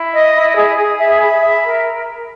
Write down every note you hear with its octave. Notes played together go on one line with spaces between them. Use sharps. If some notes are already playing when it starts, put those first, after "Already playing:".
Already playing: E4
D#5
E4
G#4
G#4
E5
B5
E5
A#4